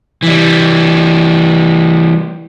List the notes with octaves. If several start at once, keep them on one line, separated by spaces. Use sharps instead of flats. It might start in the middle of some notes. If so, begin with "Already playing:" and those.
E3 G3